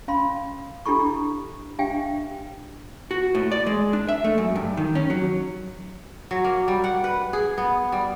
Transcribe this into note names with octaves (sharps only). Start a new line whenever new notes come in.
C#4 F5 B5 C6
D4 E4 G4 A4 B5 C#6
D4 G4 E5 F5 G5 G#5
F#4
A2
D5
G#3
D4
E5
A3
F#2
G2
D#3
C#4
F#3
F#3
A#3
G3
F#5
B4
G#4
B3
G3